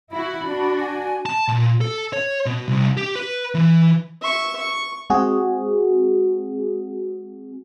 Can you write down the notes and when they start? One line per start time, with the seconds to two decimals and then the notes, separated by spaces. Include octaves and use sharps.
0.11 E4 F#4 B5
0.45 D4 F#4
0.80 G#5
1.26 A5
1.48 A#2
1.81 A4
2.13 C#5
2.46 B2
2.68 C2
2.97 G4
3.15 B4
3.54 E3
4.22 E5 C#6
4.57 C#6
5.10 G#3 C4 F#4 G#4